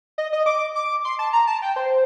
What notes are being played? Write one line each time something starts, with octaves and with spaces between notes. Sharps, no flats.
D#5
D#5
D6
D6
C6
A5
A#5
A5
G5
C5